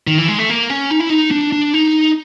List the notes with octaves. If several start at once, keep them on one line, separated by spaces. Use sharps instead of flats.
D#3
E3
G#3
A3
A#3
C#4
D#4
E4
D#4
D4
D4
D#4